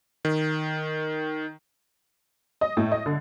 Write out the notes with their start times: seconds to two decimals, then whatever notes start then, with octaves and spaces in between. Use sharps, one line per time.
0.25 D#3
2.61 D#5
2.77 A2
2.92 D#5
3.06 D3